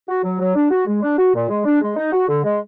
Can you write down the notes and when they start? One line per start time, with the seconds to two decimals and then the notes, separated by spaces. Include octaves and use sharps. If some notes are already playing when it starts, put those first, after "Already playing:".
0.09 F#4
0.24 F#3
0.40 F#3
0.55 D4
0.71 F#4
0.87 G#3
1.03 D4
1.18 F#4
1.34 A#2
1.49 G#3
1.65 D4
1.81 G#3
1.96 D#4
2.12 F#4
2.28 D3
2.44 G#3